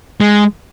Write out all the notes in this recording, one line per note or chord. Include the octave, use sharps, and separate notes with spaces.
G#3